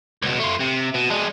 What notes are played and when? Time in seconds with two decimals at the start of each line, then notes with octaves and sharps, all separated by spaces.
0.22 C#2 B2
0.39 A3 F4
0.60 C3
0.94 B2
1.10 G#3 D4